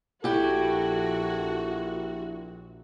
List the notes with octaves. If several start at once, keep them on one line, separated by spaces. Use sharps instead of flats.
A#1 E4 F#4 G4 A4